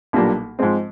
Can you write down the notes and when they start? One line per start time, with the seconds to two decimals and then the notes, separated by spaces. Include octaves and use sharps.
0.13 B1 A#2 G3 A#3 D4
0.59 G#2 F3 G#3 C4